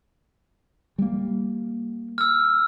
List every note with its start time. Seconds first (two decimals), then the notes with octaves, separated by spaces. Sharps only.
0.98 G3 A#3
2.18 E6 F6